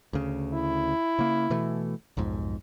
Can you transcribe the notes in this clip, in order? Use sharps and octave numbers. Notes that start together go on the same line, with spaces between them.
D2 C#3
E4
C#3 A#3
B2 E3 A3
B1 F2 G#2